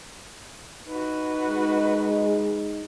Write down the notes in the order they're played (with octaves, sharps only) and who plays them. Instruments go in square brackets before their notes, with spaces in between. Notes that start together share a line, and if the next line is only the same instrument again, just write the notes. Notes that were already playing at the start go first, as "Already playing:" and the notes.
[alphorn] D#4 [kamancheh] F#4 B4
[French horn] G#3